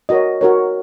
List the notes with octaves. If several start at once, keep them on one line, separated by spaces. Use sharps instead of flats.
F#4 A#4 C#5 D#5
F#4 A#4 C#5